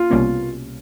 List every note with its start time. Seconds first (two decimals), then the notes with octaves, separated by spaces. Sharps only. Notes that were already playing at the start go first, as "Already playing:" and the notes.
Already playing: A#3 C#4 F4
0.10 C2 B2 G3 A#3 C#4